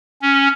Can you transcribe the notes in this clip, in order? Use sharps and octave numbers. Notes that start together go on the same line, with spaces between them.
C#4